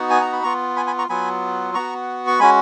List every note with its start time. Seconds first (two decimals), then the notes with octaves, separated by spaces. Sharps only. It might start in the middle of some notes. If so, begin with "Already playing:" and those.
Already playing: B3 D#4 F#4
0.10 G#5
0.21 A#5
0.33 B5
0.43 B3 F4 A#5 C#6
0.76 G#5 B5
0.87 G#5 B5
0.98 A#5 C#6
1.09 F#3 B3 F4 G#5 B5
1.74 B3 F#4 A#5 C#6
2.27 C#6
2.39 G#3 C#4 F#4 G#5 B5